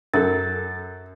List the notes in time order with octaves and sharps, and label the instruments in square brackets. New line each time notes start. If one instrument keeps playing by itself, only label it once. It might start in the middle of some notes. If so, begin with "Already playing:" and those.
[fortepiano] F#2 A4 [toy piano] A#4 [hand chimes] A6